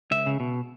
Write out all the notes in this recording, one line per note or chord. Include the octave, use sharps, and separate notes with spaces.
C#2 E5
C#3
B2